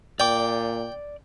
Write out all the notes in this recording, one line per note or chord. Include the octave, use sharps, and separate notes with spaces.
A#2 D5 G5 D6